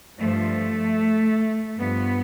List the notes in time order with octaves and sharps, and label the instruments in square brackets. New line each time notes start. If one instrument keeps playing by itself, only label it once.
[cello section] G2 F3 A3
G2 F3 B3